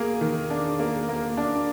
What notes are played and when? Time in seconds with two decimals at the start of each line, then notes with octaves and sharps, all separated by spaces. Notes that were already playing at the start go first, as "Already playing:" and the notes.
Already playing: A#3 G#4
0.21 D#3
0.50 D4
0.79 A#3
1.09 A#3
1.37 D4